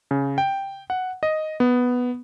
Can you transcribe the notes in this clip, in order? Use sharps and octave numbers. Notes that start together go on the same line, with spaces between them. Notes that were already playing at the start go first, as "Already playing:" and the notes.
C#3
G5
F#5
D#5
B3